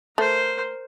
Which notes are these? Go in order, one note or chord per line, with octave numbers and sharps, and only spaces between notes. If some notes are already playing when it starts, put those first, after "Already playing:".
A3 A#4 C5